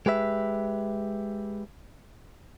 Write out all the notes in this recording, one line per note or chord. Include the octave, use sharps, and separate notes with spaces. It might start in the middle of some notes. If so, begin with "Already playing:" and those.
G#3 G4 B4 E5